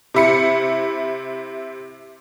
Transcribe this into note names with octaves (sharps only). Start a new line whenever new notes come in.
C3 E4 C#7